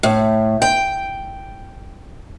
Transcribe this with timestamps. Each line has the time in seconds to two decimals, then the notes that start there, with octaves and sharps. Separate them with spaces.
0.03 A2
0.62 G5